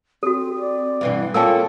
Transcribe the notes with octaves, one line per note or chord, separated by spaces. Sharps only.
C4 F#4 A4
D5
G2 B2 E3
A#3 C4 C#4 F4 A4 G5 A5 E6